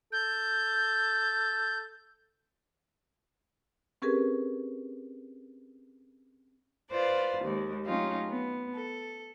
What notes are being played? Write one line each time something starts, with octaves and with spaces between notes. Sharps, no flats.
A4 G6
C4 C#4 G4 G#4 A#4 B4
F4 B4 C5 D5
D#2 G#3
F#3 A3 C#4 D#4 F4 G4
B3
A4